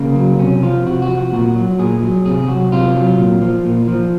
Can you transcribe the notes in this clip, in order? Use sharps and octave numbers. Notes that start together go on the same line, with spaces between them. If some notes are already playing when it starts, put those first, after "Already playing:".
Already playing: C#3 A#3
F#3
C4
C3 C#4
F3 F4
C3 F#4
F#4
F3
F#4
A#2 F#4
F#3
A#2 G#4
F#3
C3 G#4
F#3 F#4
C3 F4
F#3
A#2
F3
A#2
F3